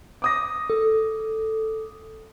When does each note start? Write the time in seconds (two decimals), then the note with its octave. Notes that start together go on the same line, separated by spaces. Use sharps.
0.22 D6 D#6 A#6
0.70 A4